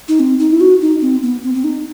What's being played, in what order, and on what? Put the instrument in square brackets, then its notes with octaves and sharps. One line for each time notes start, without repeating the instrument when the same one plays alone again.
[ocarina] D#4
C4
D#4
E4
F#4
D#4
C4
B3
C4
C4
D#4